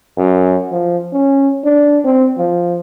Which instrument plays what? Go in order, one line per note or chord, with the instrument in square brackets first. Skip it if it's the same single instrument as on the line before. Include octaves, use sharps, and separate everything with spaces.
[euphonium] F#2
F3
C#4
D4
C4
F3